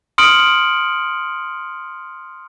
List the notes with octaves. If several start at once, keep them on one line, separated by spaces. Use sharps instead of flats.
C6 D#6 F6 C#7 D7 F#7